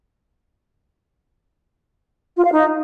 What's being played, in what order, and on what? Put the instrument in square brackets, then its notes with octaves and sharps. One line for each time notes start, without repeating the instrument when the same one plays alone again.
[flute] F4
F5
D#4